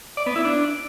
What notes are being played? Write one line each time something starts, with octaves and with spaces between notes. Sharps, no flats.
D5
B3
E4
D4